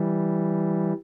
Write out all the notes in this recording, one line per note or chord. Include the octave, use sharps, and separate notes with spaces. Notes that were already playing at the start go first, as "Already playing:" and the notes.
Already playing: E3 G3